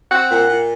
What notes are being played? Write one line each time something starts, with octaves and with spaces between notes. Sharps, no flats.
C4 F#5
A#2
A#2